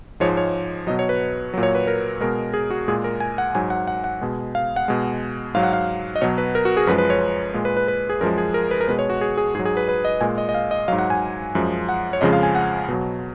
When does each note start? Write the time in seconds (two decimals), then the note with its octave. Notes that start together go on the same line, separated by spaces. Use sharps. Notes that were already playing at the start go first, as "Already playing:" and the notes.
0.20 G#2 F3 G#3 C#5
0.37 C#5
0.87 B2 F#3 D#5
0.99 C#5
1.09 B4
1.54 A#2 F#3
1.63 C#5
1.75 B4
1.87 A#4
2.21 B2 G#3 A#4
2.54 G#4
2.71 F#4
2.88 A#2 G#3 G#4
3.04 A#4
3.20 G#5
3.38 F#5
3.55 G#2 F#3 G#5
3.70 F#5
3.88 F#5
4.04 F#5
4.21 B2 G#3
4.55 F5
4.76 F#5
4.88 B2 G#3
5.54 G#2 F#3 F5
5.63 F#5
5.73 F5
6.16 D#5
6.21 B2 F#3 C#5
6.38 B4
6.55 A#4
6.65 F#4
6.77 G#4
6.87 F#2 F3 G#3 B4
6.98 B4
7.10 C#5
7.54 A#2 G#3
7.65 B4
7.77 B4
7.88 B4
8.10 G#4
8.21 F#2 F3 G#3 A#4
8.38 G#4
8.54 A#4
8.71 B4
8.81 A#4
8.88 B2 G#3 B4
8.99 C#5
9.10 F#4
9.21 G#4
9.37 G#4
9.54 G#2 G#4
9.59 F#3
9.65 G#4
9.77 B4
9.88 B4
10.05 D#5
10.21 A#2 G#3 G#5
10.38 D#5
10.49 D#5
10.54 F5
10.71 D#5
10.88 G#2 F#3 F5
10.99 F#5
11.10 G#5
11.55 F#2 F3 G#3
11.89 F#5
12.13 C#5
12.21 F2 C#3 F3 G#3 D#5
12.33 F5
12.43 G#5
12.55 F#5
12.88 B2 F#3